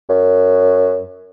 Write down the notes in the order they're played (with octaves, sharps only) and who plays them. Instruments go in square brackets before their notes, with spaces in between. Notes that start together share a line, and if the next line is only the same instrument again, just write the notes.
[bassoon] F#2